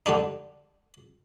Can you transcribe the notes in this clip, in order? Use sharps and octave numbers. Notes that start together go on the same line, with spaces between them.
D3 G3 D4 D#4